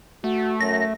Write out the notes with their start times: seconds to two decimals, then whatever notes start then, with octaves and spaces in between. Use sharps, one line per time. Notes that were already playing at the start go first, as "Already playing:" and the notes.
0.24 A3 F#4
0.61 F#2 A#6